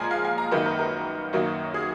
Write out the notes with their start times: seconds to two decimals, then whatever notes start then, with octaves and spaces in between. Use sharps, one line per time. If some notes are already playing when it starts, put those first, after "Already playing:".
Already playing: A#2 F3 G#3 G#5 A#5
0.11 F5
0.25 G#5
0.38 A#5
0.51 F#2 D#3 A#3 B4
0.66 A#4
0.79 A#4
1.33 F#2 D#3 F#3 A#3
1.74 G#4